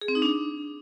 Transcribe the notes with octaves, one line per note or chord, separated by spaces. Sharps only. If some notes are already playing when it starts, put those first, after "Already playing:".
G#4
C4
D#4
D4